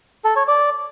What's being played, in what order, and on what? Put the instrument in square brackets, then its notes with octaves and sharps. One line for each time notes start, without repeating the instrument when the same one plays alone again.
[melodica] A4
C#5
D5